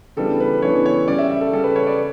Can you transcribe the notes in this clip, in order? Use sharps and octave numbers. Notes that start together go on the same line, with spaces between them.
C#3 E3 G3 B3 D4 A4
B4
C#3 E3 G3 B3 D4 C#5
C#5
C#3 G3 C#4 D5
E5
E5
A4
C#3 G3 C#4 A4
B4
C#5
D5